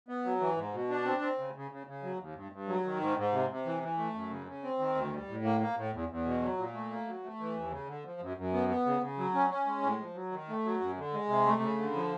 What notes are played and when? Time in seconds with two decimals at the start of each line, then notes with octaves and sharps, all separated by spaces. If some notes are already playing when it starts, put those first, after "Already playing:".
0.09 B3
0.25 F#3
0.40 E3
0.56 G#2
0.74 B2
0.90 D4
1.06 C4
1.21 C4
1.38 C#3
1.55 C#3
1.71 C#3
1.87 C#3
2.03 F#3
2.19 D#2
2.35 G2
2.52 G2
2.68 F#3
2.85 D#3
3.00 G#2
3.17 G#2
3.33 C3
3.50 C3
3.66 E3
3.83 E3
3.98 A3
4.14 F#2
4.30 C#3
4.47 C#3
4.64 C4
4.79 D#3
4.95 D2
5.13 G3
5.28 A2
5.44 A#3
5.61 A#3
5.76 A2
5.93 E2
6.09 E2
6.25 B2
6.42 F#3
6.58 A#2
6.74 A3
6.90 A#3
7.07 F#3
7.24 A3
7.40 E3
7.56 D#2
7.71 C#3
7.88 D3
8.05 F3
8.21 F#2
8.37 F#2
8.53 B3
8.69 B3
8.86 C#3
9.01 C#3
9.18 F#3
9.34 C#4
9.50 C#4
9.66 G#3
9.83 A2
10.00 F3
10.15 F#3
10.32 D#3
10.49 A3
10.65 F#3
10.81 F#2
10.97 D3
11.13 G#3
11.29 C3
11.46 A3
11.61 C#3
11.78 D3
11.95 F3